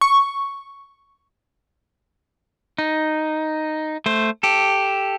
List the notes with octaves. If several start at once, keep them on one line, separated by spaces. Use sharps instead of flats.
C#6
D#4
A3 C5
G4 A4